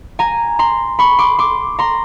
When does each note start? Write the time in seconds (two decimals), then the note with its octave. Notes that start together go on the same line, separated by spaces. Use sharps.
0.19 G#5 A#5
0.59 A#5 C6
0.99 B5 C#6
1.18 C6 D6
1.39 C6 D6
1.79 A#5 C6